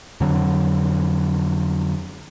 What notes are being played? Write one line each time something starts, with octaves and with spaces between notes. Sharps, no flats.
F2 D3 F#3